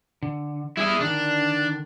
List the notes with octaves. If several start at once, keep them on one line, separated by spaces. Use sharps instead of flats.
D3
G3 E4 G#4
D3 D#3 D4